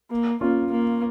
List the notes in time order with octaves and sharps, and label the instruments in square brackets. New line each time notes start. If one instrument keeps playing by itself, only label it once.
[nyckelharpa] A#3
[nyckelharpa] A#3 [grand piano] C#4 F4
[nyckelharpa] A#3